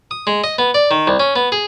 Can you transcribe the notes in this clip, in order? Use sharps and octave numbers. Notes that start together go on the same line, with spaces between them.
D#6
G#3
D#5
B3
D5
D#3
C2
C#4
B3
G#4